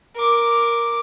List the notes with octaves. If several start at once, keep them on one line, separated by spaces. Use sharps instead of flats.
A#4 D6